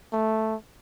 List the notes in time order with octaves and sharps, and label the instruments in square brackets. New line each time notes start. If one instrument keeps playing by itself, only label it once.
[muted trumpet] A3